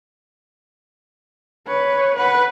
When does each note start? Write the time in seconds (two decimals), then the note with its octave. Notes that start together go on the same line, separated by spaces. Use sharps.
1.67 B4 C#5
2.16 B4 F#5